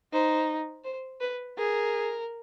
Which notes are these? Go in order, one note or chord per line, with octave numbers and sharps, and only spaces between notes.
D#4 C5
C5
B4
G#4 A#4